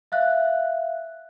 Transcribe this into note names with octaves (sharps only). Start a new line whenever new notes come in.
E5 F5 F#6